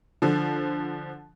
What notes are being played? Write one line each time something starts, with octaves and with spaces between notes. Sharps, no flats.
D3 F3